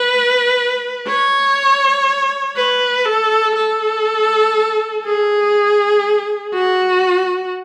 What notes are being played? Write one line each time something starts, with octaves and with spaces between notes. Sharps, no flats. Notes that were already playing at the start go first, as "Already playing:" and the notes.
Already playing: B4
C#5
B4
A4
A4
G#4
F#4